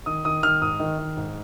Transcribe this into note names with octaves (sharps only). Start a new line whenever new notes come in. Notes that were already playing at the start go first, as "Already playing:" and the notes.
D#3 D#6
D#3 D#6
D#3 F6
G#2 D#6
D#3
D#3
G#2